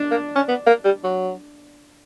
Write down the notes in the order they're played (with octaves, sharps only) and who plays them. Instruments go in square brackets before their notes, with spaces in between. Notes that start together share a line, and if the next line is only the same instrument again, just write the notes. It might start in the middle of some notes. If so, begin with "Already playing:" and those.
Already playing: [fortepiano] D4
[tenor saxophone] A#3
C#4
B3
A#3
G3
F#3